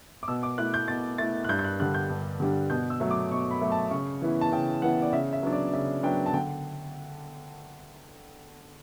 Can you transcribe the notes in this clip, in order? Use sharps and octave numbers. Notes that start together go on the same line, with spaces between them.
D6
B2 E6
D6
A3 E4 F#6
G6
B2 A6
A3 E4 A6
F#6
G2 G6
G6
F#6
D3 G3 D4 F#6
G6
G2
D3 G3 D4
B2 G6
E6
F#3 A3
D6
B2 C#6
B5
F#3 A3
A5
C#3 C#6
E3 B3 E4
A5
C#3 G5
E3 B3 E4 F#5
D5
C#3 E5
E5
F#3 B3 D4
D5
C#3 E5
F#3 B3 D4 G5
A5
D3 G5